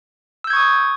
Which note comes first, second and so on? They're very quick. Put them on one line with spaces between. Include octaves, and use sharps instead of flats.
E6 G6 G#6 C#6 D#6